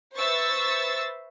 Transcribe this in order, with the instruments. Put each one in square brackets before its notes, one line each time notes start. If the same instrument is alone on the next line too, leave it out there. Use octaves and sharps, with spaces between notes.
[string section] B4 C5 E5 C#6 E6 A6